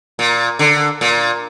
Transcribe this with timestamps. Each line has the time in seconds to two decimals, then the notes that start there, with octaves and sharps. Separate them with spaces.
0.19 A#2
0.59 D3
1.01 A#2